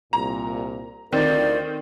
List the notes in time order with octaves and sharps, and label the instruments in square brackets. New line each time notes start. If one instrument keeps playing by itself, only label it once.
[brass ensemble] C2 A#2 [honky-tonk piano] A#5
[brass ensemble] D2 F4 A#4 [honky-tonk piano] D#3 C4 [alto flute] D5